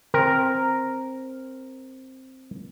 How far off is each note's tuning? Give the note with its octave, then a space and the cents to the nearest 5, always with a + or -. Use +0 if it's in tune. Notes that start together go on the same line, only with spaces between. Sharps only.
C4 +5 A#4 +0